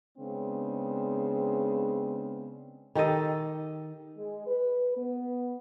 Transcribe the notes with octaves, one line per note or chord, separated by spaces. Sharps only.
C#3 G#3 B3 C4 D4
D#3 G4 A4 D#5
G#3
B4
B3